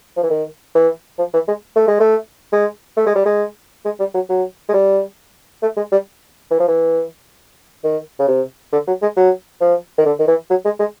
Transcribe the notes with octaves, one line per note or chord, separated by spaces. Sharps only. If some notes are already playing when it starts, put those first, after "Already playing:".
F3
E3
D#3
E3
F3
E3
G#3
A3
G#3
A3
G#3
A3
G#3
G3
G#3
G#3
G3
F#3
F#3
G#3
G3
A3
G#3
G3
E3
F3
E3
D#3
C#3
C3
D3
F#3
G#3
F#3
F3
D#3
D3
D#3
E3
F#3
G#3
G#3